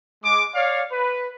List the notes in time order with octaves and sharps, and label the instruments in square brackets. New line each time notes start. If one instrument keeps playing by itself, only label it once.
[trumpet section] G#3 D6
C#5 D5 F5
B4